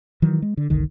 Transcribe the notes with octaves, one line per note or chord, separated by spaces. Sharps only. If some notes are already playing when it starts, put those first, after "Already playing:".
D#3 E3 F#3
G#3
D3
F#1 C2 D3 D#3